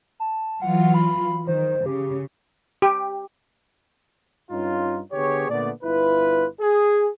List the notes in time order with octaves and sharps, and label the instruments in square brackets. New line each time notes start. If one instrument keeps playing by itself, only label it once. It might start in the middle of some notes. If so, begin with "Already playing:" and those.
[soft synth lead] A5
[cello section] E3 F#3 F4 [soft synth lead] F#5
[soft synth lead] B5
[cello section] D#3 [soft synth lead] C5
[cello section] C#3 [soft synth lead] G4
[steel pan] G4
[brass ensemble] G2 C#4 D#4 F4
D3 B3 G4 G#4 C#5
A#2 D3 A3 B3 D5
G1 E4 F4 B4
G#4